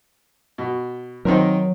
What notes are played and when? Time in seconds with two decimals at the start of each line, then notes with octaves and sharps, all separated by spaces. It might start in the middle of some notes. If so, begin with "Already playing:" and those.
0.58 B2
1.25 D#3 F#3 C4 A#4